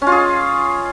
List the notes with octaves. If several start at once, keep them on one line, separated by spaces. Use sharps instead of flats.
C#4
F4
G#4